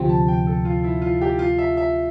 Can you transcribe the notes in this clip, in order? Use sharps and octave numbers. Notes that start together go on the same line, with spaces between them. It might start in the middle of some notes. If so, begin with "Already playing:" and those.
Already playing: D2 C3 F3 C4 G5
A5
G5
A4
F4
E4
F4
G4
F4
E5
E5